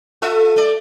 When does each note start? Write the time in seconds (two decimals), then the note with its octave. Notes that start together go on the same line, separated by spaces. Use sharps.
0.22 F4 A4 E5
0.56 A3 D5